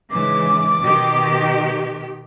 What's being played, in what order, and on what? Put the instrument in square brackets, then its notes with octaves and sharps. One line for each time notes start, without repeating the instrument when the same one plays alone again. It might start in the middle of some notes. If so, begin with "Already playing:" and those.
[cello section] G#2 C#3 E3 [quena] D6
[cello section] B2 D#3 G4